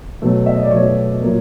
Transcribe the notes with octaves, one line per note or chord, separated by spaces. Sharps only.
B2 F#3 A3
E5
D#5
D5
B2 F#3 A3 C#5
A#2 F#3 A#3